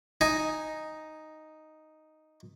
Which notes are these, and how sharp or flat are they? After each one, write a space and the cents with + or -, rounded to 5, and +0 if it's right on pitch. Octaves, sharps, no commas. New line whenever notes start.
D#4 +0 G#5 +0